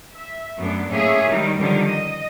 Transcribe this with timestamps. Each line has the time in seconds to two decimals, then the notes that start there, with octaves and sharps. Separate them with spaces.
0.14 E5
0.57 F#2 F#3 A3 B3 D4
0.90 A2 A#3 C#4 G#4 C#5 E5
1.28 D#3 G3 G#3 D#4
1.57 D3 D#3 F3 G3 C#4
1.88 D#5